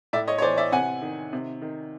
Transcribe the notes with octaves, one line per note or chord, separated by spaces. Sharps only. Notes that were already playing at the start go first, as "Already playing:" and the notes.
A2 D5 E5
C#5 D#5
C#5
E3 C5 D5
D5 E5
C3 F#5 G#5
D#3
C3
D#3